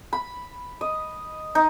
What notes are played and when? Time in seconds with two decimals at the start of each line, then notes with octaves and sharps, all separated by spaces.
0.13 B5
0.81 D#5
1.55 D#4